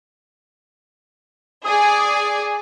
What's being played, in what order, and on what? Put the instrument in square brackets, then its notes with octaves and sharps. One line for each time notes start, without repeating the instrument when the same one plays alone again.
[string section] G#4 D5 G#5 [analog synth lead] D#6